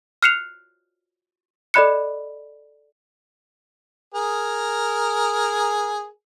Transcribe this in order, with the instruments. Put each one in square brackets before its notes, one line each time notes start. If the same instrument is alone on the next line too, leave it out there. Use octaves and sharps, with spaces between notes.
[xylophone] F6 F#6 C7 C#7 E7 F7
A4 D5 D#5 B5 F#6 C#7
[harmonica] G#4 A#4